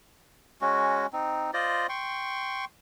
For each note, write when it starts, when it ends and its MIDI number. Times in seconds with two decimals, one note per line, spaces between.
0.61 1.06 56
0.61 1.06 61
0.61 1.06 66
1.13 1.51 60
1.13 1.51 63
1.53 1.87 65
1.53 1.87 72
1.53 1.87 74
1.53 1.87 75
1.89 2.65 79
1.89 2.65 84
1.89 2.65 85